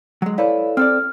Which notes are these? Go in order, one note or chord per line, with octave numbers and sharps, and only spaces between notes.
F#3 G#3
E4 A4 B4 C#5 D5 F5
C4 A4 D5 F6